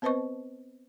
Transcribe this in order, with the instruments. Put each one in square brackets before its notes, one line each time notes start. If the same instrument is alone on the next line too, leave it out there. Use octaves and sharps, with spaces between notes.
[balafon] B3 C4 B4 C5 D#5 C#6